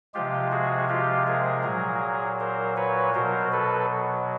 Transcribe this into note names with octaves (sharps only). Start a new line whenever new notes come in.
C3 F3 G#3 F4 G4
F#4 G#4
F4 G4
G#4 A#4
A#2 F#3
A#4 C5
B4 C#5
B2 F#3 A#4 C5
A4 B4